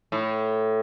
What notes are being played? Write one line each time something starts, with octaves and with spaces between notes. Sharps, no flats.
A2